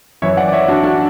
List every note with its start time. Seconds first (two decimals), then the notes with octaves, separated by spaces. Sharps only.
0.22 F#2 E3 C#5 E5
0.37 D5 F#5
0.48 D5
0.53 C#5 E5
0.68 D4 F#4
0.83 D4 F#4